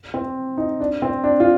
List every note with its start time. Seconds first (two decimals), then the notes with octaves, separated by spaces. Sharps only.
0.14 C4
0.58 D#4
0.80 D4
1.02 C4
1.24 D4
1.40 F4